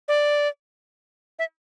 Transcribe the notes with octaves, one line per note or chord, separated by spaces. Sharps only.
D5
E5